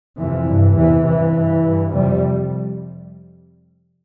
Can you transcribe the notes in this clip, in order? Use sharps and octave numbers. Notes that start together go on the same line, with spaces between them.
F2 C3 E3
G2
E2 C3 E3
G2 E3
G2
G2
F2 C3 G3